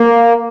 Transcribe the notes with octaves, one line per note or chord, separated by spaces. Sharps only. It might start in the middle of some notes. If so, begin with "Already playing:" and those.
Already playing: A#3